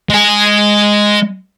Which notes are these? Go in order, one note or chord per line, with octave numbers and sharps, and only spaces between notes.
G#3 G#5